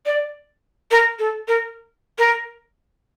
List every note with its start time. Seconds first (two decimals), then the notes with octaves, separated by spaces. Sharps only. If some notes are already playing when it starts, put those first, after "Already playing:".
0.06 D5
0.91 A#4
1.19 A4
1.48 A#4
2.18 A#4